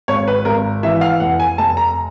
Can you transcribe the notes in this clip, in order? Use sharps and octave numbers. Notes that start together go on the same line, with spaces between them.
G#1 C#5
B4
G#1 A#4
E3 E5
F5
F1 F#5
G#5
F1 A5
A#5